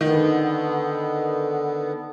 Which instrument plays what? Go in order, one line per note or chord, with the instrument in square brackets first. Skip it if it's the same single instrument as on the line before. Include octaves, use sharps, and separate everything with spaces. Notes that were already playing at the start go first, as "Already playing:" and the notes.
[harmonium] D3 B3 [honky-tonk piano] D#3